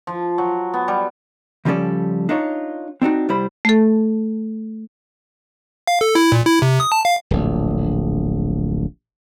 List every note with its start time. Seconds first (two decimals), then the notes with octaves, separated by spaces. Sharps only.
0.07 F3
0.38 F#3
0.74 B3
0.88 G3
1.65 C#3 F3 G3 C#4 A4 D5
2.29 D4 D#4 F4 C#5
3.02 C4 D4 D#4 F#4
3.29 C2 G3 E4 C5 B5
3.65 A3 A4
5.87 F5
6.01 A4
6.15 E4
6.32 A#2
6.46 E4
6.62 C3
6.80 D#6
6.92 A5
7.05 F5
7.31 D1 A#1